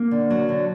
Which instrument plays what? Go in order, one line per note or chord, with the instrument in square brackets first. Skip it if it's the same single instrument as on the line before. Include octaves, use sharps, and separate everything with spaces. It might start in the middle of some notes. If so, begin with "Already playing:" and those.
Already playing: [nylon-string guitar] A#3
D3
F#3
D3